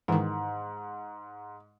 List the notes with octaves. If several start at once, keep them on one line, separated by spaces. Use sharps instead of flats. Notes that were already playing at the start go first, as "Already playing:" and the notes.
G#2 D#3 E3